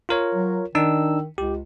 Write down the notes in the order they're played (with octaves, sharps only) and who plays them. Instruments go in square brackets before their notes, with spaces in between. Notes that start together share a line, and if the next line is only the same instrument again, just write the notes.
[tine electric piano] F4 A#4 C#5
[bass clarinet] F#3
[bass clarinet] D#3 [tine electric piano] D4 D#4 E6
[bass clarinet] C#2 [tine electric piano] G4